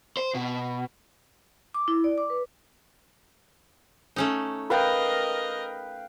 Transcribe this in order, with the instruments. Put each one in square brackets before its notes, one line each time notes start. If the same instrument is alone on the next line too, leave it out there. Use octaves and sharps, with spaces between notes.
[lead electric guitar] C5
B2
[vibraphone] D6
E4
D5
D6
B4
[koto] A3 C#4 D#4
[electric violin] A#4 D#5 [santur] B4 F5 G5